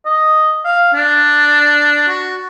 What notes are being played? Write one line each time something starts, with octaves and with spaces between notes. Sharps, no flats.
D#5
F5
D4
F#4